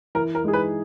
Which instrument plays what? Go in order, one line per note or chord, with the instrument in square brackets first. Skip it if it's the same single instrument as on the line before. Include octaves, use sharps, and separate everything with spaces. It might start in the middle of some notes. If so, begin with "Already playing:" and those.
[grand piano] E3 [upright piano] A#4
[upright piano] A#4
[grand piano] G#3 D#4 G#4
[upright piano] B4